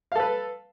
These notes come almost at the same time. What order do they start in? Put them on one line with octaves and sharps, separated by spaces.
F5 A4 B4